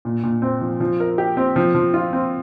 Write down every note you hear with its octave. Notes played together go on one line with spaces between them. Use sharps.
A#2
A#2
C4
F3
F3
A#4
G4
C4
F3
F3
F4
C4